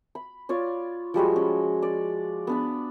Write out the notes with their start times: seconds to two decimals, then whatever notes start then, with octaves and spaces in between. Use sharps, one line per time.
0.15 B5
0.49 F4 C#5 D5
1.14 F3 G3 G#3 F#4
1.36 C#4
1.82 D5
2.47 B3 D4 B5